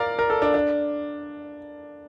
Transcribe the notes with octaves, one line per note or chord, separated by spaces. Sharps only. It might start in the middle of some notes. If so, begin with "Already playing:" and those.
Already playing: A#4 D5 F5
A#4
A4
D4
D4